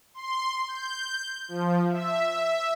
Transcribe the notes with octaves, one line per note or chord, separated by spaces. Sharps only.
C6
G6
F3
E5